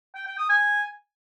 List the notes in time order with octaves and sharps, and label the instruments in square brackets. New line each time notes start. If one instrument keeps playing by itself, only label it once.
[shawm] G5
G5
D#6
G#5